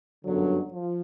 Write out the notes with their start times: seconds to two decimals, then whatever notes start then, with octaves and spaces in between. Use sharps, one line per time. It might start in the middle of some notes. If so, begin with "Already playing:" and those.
0.24 G1 F#2 D3 F#3
0.71 F3